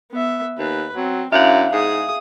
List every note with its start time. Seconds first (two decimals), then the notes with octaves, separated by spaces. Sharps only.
0.12 B3 E5
0.58 D#2 B4
0.96 F#3 C4
1.32 F#2 D4 E4 E5 F5
1.72 G#2 G#4 D#6